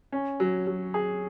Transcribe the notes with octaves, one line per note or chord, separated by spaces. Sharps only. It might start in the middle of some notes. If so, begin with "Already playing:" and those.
C#4
F#3
F#3
G#4